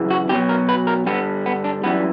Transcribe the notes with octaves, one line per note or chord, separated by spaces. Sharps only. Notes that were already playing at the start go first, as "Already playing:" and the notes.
Already playing: F#2 C#3 E3
F#4
B2 F#3 G4
A#4
B4
A#4
G2 D3 G3 B3
B3
D4
F#2 E3 G3 B3